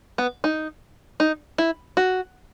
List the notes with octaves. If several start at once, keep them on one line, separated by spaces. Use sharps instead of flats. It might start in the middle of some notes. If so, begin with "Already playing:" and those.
B3
D#4
D#4
E4
F#4